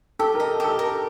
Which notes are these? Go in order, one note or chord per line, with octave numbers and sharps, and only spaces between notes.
G4 A4
A#4
D#5
G4 A4
A#4